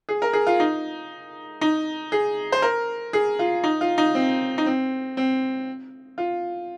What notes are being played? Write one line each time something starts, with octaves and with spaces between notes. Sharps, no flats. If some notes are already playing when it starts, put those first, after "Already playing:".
G#4
A#4
G#4
F4
D#4
D#4
G#4
C5
A#4
G#4
F4
D#4
F4
D#4
C4
D#4
C4
C4
F4